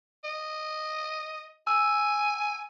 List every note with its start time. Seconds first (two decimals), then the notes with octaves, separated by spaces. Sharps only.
0.24 D#5
1.67 G#5 E6